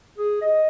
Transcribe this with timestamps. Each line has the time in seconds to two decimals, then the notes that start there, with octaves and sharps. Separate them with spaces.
0.17 G#4
0.42 D#5